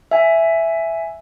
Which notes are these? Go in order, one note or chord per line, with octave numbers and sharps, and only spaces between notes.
E5 G#5